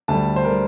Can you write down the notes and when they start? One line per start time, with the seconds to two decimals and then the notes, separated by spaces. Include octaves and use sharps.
0.08 D2 D3 G3 A5
0.36 C5
0.45 D3 G3 A#4